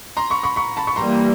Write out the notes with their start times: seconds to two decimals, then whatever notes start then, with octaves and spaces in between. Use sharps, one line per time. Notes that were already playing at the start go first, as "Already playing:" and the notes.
0.17 A#5 C6
0.30 B5 C#6
0.43 B5 C#6
0.56 B5 C#6
0.77 A5 B5
0.87 B5 C#6
0.96 E3 G3 A#3 A#5 C6